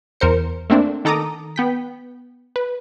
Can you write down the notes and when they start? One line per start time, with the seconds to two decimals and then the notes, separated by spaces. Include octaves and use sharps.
0.20 E2 A#4 C5 C#7
0.70 A3 A#3 C4 D4
1.05 D#3 A4 A#5 D6 D#6
1.56 B3 G5 B6
2.56 B4